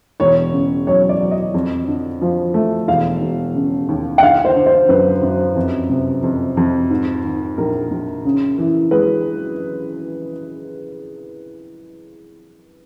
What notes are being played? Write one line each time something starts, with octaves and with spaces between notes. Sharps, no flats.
E1 C#5
C#3
F#3 C#5
D5
F#3
D#5
F2
D3
F3
A3
E1 F5
E1
C#3
D#2
F#5
D3 F5
C5
D3
C5
F#2 B4
F#2
F2
C3
F2
F2
G#2
D#3
A#1 A#4
A#1
C#3
E3
G#3 B4